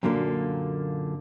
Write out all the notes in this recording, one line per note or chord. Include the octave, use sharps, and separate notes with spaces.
F#2 A#2 D3 A#3